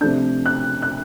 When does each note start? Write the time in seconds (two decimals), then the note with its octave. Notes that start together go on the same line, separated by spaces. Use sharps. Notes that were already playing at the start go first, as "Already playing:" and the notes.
0.01 C3 F3 A3 D4 G6
0.46 F#6
0.82 F#6